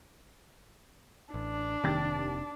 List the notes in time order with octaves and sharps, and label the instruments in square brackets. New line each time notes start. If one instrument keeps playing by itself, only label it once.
[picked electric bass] A1 [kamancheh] D4
[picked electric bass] F1 C3 [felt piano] D#2 G5 A6